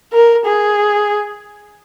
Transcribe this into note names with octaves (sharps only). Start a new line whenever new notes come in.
A#4
G#4